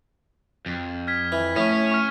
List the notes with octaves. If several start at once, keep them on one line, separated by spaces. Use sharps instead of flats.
F2
F6 G#6 B6
E3
A2 C#4
C#6 F6